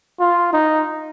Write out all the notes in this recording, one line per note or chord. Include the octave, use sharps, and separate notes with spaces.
F4
D#4